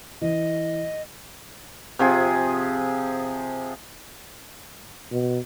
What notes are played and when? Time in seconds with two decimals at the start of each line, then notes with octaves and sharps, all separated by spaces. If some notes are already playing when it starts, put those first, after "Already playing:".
0.22 E3 D#5
1.99 C3 F3 G#4
5.12 B2